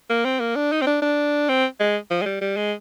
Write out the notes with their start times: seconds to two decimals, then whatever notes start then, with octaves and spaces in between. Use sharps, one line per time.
0.10 A#3
0.25 C4
0.40 A#3
0.56 D4
0.72 D#4
0.82 C4
0.87 D4
1.02 D4
1.49 C4
1.80 G#3
2.11 F3
2.22 G#3
2.26 G3
2.41 G3
2.57 G#3